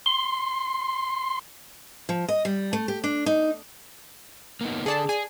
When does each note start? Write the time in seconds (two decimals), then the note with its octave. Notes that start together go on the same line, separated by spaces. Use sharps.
0.06 C6
2.09 F3
2.28 D#5
2.45 G3
2.73 A3
2.88 G4
3.04 D4
3.26 D#4
4.61 A#3 B3 D#4
4.86 D3 G#4 A4 D5 A5
5.09 G#4 G#5